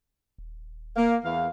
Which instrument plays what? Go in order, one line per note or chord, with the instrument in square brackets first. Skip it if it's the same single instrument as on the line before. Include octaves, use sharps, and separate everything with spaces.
[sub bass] D#1
[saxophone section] A#3
E2 E3 F5